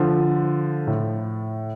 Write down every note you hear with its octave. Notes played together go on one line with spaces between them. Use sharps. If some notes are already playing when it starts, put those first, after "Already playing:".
Already playing: D3 F3
A2